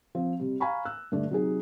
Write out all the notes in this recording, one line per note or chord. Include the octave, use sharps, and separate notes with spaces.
F3 C4
C3 G3
F5 G#5 A#5 B5 C#6
E6 F#6
G2 D3 A3 D4
C3 F#3 D#4 G#4